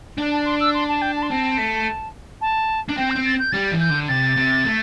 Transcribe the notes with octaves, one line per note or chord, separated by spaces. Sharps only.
D4
A5
C6
E6
C6
A5
G5
A5
C6
C4 A5
A3
A5
D4
C4 G5
G6
C4
A6
G6
G3 A6
E3
G6
D3
C3 A6
C3
A3